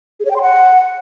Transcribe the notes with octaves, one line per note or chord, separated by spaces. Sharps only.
G#4
C#5
G5
C6
F#5